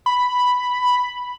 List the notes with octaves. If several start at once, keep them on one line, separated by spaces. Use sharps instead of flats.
B5